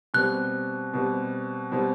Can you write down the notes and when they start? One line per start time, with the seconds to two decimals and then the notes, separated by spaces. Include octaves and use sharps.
0.14 B2 G3 C4 F#6
0.94 B2 G3 C4
1.72 B2 G3 C4